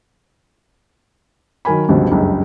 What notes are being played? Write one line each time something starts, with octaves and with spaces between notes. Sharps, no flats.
D#3 F#3 A#4 G#5 B5
C#2 G2 B2 D3 F3
F#1 C#2 G2